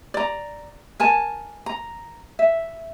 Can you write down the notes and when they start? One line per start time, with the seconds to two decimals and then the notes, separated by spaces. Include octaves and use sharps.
0.14 D5 A#5
1.00 A#4 G#5 A5
1.66 A#5
2.39 E5